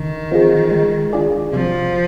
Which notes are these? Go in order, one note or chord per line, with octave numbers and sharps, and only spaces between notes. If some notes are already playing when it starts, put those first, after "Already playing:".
Already playing: D3 D#3
F3 C4 F4 G#4
G#3
D4 F4 G#4 D5
C3 F3